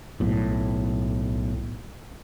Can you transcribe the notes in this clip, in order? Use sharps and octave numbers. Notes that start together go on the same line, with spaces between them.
B1 A2